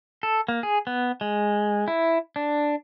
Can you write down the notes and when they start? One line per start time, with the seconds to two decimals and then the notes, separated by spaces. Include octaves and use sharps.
0.23 A4
0.48 A#3
0.63 G#4
0.87 B3
1.21 G#3
1.88 E4
2.36 D4